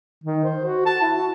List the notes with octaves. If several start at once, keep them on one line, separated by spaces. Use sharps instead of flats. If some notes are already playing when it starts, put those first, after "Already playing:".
D#3
C5
F#4
A5
E4
F#4